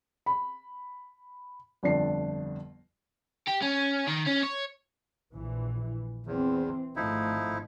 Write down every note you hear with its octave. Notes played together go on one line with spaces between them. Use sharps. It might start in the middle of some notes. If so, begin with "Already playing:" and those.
B5
G1 F2 D4 C7
G4
C#4
D#3
C#4
C#5
A#1 E3
E2 E3 C4
G#1 F3 A3 D#4 E4